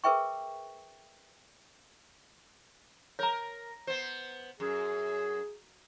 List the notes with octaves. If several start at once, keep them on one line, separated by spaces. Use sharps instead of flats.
G#4 A#4 B4 E5 G5 C#6
A#4 C#5 A#5
B3 C5
F#2 G#4